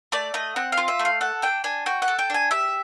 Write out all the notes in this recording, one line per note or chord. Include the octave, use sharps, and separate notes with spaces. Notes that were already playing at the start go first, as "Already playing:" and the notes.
A3 D5
A3 D#5
C4 F#5
F5
F4
E5
A3
F5
A4 F#5
D4 G5
D4 G#5
F#4 G5
F#5
A4
G5
D4 G#5
G4 E5